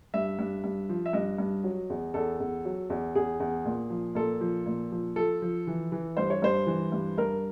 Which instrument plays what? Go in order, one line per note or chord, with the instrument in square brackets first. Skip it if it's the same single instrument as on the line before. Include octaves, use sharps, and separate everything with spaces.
[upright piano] G2 E5
G2
G2
F3
E5
G2 D#5
G2
F#3
E2
E2 A4
E2
F#3
E2
E2 G#4
E2
A#2
F3
A#2 A4
F3
A#2
F3
F3 A4
F3
E3
E3
G2 C5
C#5
G2 C5
E3
G2
G2 A#4